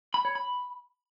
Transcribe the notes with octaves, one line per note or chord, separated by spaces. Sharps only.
B5
C#5
B5